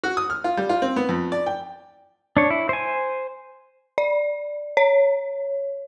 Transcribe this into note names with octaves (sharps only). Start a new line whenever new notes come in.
F#4
D#6
F6
F4
G3
F4
C4
B3
F2
D5
G5
D4 C#5
E4
C5 G#5
D5
C#5